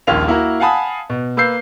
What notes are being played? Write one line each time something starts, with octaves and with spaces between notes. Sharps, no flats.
D#1 A#1 D#2 F4 F7
A#3 E4 F#4 A#4
F5 F#5 G#5 A5 B5 D#6
B2
A#3 B4 E6 G6 C7